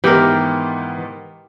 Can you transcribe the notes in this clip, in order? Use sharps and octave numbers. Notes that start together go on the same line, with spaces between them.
G#2 D#3 E3 B3 G4 A#4